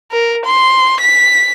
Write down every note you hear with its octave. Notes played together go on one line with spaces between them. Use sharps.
A#4
C6
B6